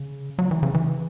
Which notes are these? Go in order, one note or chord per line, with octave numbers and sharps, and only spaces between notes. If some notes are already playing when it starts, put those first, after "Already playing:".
Already playing: C#3
F#3
E3
C#3
E3